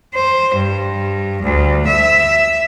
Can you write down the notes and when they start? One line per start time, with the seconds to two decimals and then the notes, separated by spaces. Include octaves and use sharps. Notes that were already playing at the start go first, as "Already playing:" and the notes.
0.14 C5
0.56 G2
1.43 D2
1.88 E5